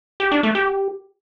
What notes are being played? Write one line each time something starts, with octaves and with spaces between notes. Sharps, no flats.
G4
D4
A3
G4